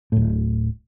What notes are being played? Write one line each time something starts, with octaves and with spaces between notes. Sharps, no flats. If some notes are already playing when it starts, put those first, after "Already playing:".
D1 A2